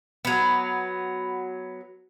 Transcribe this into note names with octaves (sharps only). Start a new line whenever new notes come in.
F#3 B3